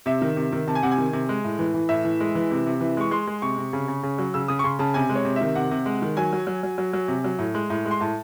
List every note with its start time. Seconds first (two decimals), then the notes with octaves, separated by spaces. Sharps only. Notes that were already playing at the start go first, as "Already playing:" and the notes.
0.06 C3 E5
0.21 D#3
0.36 C3
0.52 D#3
0.68 C3 A5
0.75 G#5
0.83 C3 F#5
0.91 G#5
0.98 D#3
1.13 C3
1.29 G#3
1.44 A2
1.59 E3
1.74 E3
1.89 A2 E5
2.05 E3
2.20 G#3
2.35 E3
2.51 C3
2.66 C3
2.81 E3
2.97 G#3 C#6
3.11 G#3 C6
3.27 G#3
3.42 C3 C#6
3.58 C3
3.73 C#3
3.88 C#3
4.03 C#3
4.18 F#3
4.34 C#3 E6
4.48 C#3 D#6
4.59 C#6
4.64 C#3 C6
4.79 C#3 A5
4.94 C3 G#5
5.09 G#3
5.15 C#5
5.25 C3
5.36 E5
5.41 D#3
5.55 C3 F#5
5.71 C3
5.86 G#3
6.02 D#3
6.17 F#3 G#5
6.33 F#3
6.47 F#3
6.63 F#3
6.78 F#3
6.93 F#3
7.08 C3
7.24 F#3
7.39 A2
7.55 G#3
7.70 A2
7.85 G#3
7.91 C6
8.00 A2 A5